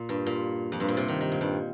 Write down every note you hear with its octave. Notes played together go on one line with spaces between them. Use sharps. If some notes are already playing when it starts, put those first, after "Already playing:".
Already playing: A#2
G2
A#2
F2
G2
A#2
C3
D#3
D#3
A#2
G2